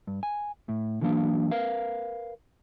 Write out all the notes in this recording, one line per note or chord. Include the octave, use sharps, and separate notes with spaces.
G2
G#5
A2
D3 E3 F#3 A#3 D4
A#4 B4 F5